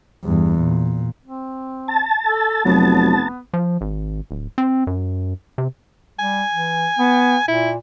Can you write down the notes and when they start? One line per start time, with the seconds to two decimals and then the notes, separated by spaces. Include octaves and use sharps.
0.24 E2 G2
0.58 A#2
1.25 C4
1.88 A5
2.27 A4
2.65 F1 F#3 B3
3.53 F3
3.81 G#1
4.31 D1
4.58 C4
4.87 F#2
5.58 C3
6.19 G3 G#5
6.50 E3
6.99 B3
7.48 A#2 E4